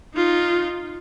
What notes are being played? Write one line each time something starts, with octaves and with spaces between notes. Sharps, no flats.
D#4 F4